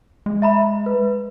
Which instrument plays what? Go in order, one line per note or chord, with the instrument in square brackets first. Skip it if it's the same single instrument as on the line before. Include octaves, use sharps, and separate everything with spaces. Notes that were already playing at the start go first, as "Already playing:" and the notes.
[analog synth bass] G#3
[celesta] E5 A#5 B5
B4